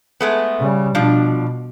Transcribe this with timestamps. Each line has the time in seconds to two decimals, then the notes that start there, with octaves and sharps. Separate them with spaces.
0.21 G#3 A3 B3
0.60 C#3 G3
0.95 B2 F3 D4